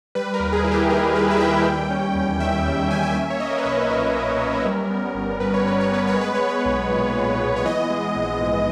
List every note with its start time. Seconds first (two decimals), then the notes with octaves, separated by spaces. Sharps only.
0.15 G3 B4
0.34 A#4
0.40 D#2
0.52 G#4
0.64 D#2 E4
0.71 G4
0.90 D#3 A#4
1.15 G3 B4
1.30 E5
1.40 D#2 G5
1.65 G3
1.90 C#4
2.15 E2
2.40 D#3 E5
2.65 G3
2.90 C#4 G#5
3.03 G5
3.15 A#3 E5
3.30 C#5
3.40 C#4 D#5
3.51 A#4
3.58 B4
3.65 B1 C#5
3.90 A#2 A#4
4.15 A#3
4.40 C#4
4.65 G3
4.90 B3
5.15 G1
5.40 G2 B4
5.54 C#5
5.65 G3 B4
5.80 C#5
5.91 B3 B4
6.07 C#5
6.16 G#3
6.21 B4
6.34 C#5
6.40 B3
6.48 B4
6.65 B1
6.90 A#2
7.15 G#3
7.40 B3
7.56 C#5
7.65 E3 D#5
7.90 G#3
8.15 A#1
8.40 G#2